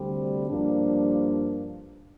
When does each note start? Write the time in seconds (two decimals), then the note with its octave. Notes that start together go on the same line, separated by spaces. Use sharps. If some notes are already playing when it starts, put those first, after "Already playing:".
Already playing: D2 C3 G3 C4
0.47 G2 F3 A#3 D4